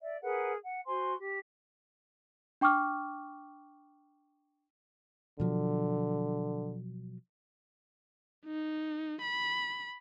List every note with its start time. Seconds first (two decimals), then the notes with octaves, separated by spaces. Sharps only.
0.02 D5 E5
0.21 G#4 A#4 B4 F#5
0.63 F#5
0.86 F#4 C5 G#5 C6
1.17 G4
2.61 D4 G5 C#6 D6 F6
5.40 B2 D3 F3 F#3
8.46 D#4
9.22 B5